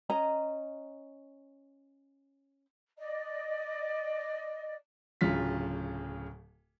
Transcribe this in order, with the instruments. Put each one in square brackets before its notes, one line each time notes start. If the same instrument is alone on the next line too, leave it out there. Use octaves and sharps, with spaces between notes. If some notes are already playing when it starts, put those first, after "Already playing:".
[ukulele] C#4 D#5 A#5
[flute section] D5 D#5
[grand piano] D1 D2 C#3 F#3 F4 B6